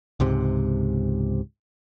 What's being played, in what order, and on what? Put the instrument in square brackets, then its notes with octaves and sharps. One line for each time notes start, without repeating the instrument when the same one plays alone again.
[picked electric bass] C#2 G#2 C3